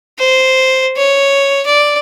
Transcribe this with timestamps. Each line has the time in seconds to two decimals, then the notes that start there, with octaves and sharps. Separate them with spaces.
0.18 C5
0.97 C#5
1.66 D5